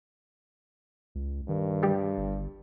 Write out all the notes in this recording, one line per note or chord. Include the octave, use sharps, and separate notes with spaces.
C#2
G2 D#3
G3 G4
G1